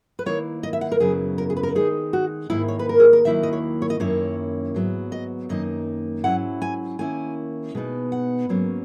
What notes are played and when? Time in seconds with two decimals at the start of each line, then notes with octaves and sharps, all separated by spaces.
0.19 B4
0.26 D#3 A#3 E4 C#5
0.63 D#5
0.73 E5
0.81 F#5
0.92 A#4
1.00 F#2 C#3 F#3 B3 E4 G#4
1.38 A#4
1.50 G#4
1.57 B4
1.63 A#4
1.75 D#3 G#3 D#4 G#4
2.13 F#4
2.50 G#2 D#3 A#3 E4
2.68 C#5
2.79 B4
2.89 A#4
3.00 G#4
3.13 A#4
3.24 D#2 D#3 F#3 A#3 E4 E5
3.43 D#5
3.53 C#5
3.82 C#5
3.90 D#5
4.00 F#2 D#3 A#3 C#4 E4 C#5
4.75 G#2 F#3 B3
5.12 D#5
5.49 F#2 D#3 A#3 D#4 D#5
6.24 G#2 F#3 C#4 E4 F#5
6.62 G#5
6.99 D#3 A#3 C#4 E4 G#5
7.75 B2 G#3 B3 D#4
8.12 F#5
8.49 G#2 F#3 A#3 C#4